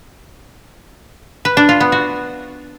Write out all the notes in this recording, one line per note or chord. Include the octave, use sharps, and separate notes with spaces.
B4
D4
F4
B3
F#4